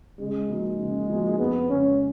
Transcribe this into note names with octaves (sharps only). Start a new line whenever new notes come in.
C#3 G#3
F3 A#3 D#4 F#4
C#3
F3 A#3 D#4 F#4
F2 B3
C#3 G#3 C#4